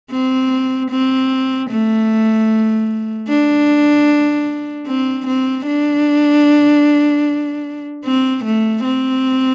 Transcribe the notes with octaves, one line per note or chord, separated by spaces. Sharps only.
C4
C4
A3
D4
C4
C4
D4
C4
A3
C4